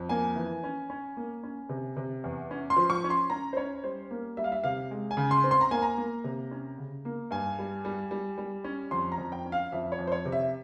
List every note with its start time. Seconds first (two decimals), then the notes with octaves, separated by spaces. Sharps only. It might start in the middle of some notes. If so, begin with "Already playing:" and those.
Already playing: F2
0.09 A#3 G#5
0.36 E3
0.64 C#4
0.90 C#4
1.17 A#3
1.43 C#4
1.69 C3
1.97 C3
2.24 E2
2.51 C#4
2.70 C6
2.76 F3
2.90 C#6
3.04 C#4
3.10 C6
3.30 C#4 A#5
3.53 C5
3.57 C#4 C#5
3.84 G3 C5
4.11 A#3
4.37 G3 E5
4.44 F5
4.52 E5
4.64 C3 F5
4.91 G#3
5.11 G#5
5.17 C#3
5.31 C6
5.44 C4
5.51 C6
5.61 A#5
5.71 A#3 G#5
5.82 A#5
5.97 A#3
6.24 C3
6.51 C#4
6.78 C#3
7.05 A#3
7.31 G2 G#5
7.59 G3
7.85 G3
8.11 G3
8.38 G3
8.64 C#4
8.91 F2 C6
9.12 A#5
9.18 F2
9.32 G5
9.46 C#4
9.52 F5
9.72 F2 E5
9.92 C#5
9.99 F2
10.07 C5
10.12 C#5
10.25 C3
10.32 E5